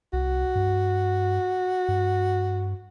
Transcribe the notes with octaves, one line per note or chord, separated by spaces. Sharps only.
C2 F#4
G2
G2